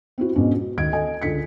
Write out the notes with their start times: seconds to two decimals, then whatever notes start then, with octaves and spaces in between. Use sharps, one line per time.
0.18 C4 E4 F#4
0.35 G#2 B2 B3 C#4 D4
0.53 F#4
0.77 D2 D#3 G#6 D7
0.92 A4 D#5 G#5
1.22 C#2 D3 B6 C#7